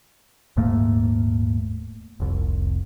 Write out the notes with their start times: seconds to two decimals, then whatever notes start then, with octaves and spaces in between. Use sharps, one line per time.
0.57 D#1 G#2 A3 A#3
2.20 F1 C2